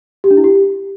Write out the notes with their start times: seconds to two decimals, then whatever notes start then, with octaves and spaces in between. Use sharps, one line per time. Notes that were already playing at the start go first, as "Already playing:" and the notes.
0.24 G4
0.31 D4
0.37 E4
0.44 G4